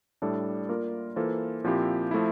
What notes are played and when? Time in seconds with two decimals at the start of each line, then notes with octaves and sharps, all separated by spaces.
0.22 A2 G3 D4 A4 D5
0.69 A#3 F4 A#4 D5
1.16 E3 A#3 F4 A4 C5
1.64 A#2 F3 C4 E4 G4
2.11 F3 A3 E4